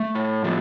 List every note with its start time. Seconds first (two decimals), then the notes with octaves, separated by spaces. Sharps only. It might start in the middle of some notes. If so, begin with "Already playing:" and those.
Already playing: A3
0.15 A2
0.44 F3